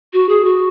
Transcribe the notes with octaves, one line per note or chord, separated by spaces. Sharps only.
F#4
G#4
F#4